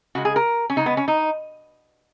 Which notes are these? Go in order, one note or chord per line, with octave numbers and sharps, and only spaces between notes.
C#3 G#3 F#4
G#4
A#4
C#4
C#3 G#3 D#4
B3
C#4
D#4